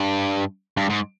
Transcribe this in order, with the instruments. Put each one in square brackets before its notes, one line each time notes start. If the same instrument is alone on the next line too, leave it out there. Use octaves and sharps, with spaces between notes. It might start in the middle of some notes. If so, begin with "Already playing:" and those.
Already playing: [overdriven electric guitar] G2
G2
G#2